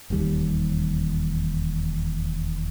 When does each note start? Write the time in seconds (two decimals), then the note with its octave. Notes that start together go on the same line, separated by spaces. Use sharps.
0.10 E1 D#2 G3